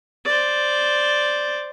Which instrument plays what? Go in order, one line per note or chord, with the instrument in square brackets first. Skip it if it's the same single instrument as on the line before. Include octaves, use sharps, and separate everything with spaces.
[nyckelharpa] C5 D5